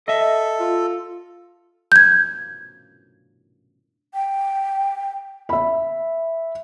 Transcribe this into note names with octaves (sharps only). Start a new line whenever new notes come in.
A4 D#5 E5
F4
G6 G#6
G5
E5 B5